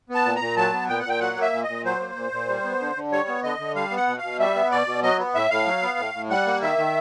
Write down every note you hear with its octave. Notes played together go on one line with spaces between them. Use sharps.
B3
A5
A#2
A#2 A#5
F#3 A5
B3
A#2 G5
F#5
A#2 G5
F#3 F#5
A#3
E5
A#2
D#5
A#2
F#3 C5
A#3
A#2
A#2
G3
B3
D3
D3
G3 C#5
B3
D3 D#5
D3
G3 F5
B3
F#5
B2
F5
B2
G3 E5
B3
B2 D5
B2
F#3 D#5
B3
A2 E5
A2 F5
F#3
B3
A2
A2
G3 F#5
A#3
D#3 E5
D#3